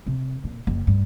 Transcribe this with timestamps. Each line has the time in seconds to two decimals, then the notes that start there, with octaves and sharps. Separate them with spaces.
0.06 C3
0.44 A#2
0.67 F#1
0.87 G2